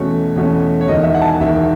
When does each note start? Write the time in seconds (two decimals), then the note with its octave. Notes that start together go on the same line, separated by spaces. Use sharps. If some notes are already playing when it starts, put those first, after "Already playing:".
Already playing: E2 B2 A3 C#4 C#5
0.36 E2 B2 A3 C#4
0.81 C#5
0.88 E1 E2 D#3 D#5
1.03 E5
1.14 F#5
1.22 A5
1.27 G#5
1.40 E1 E2 D#3 E5